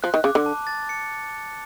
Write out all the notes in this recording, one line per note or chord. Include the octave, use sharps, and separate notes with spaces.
F3 F#6
D#3
C#3 D6
D3
A5
A6
C#7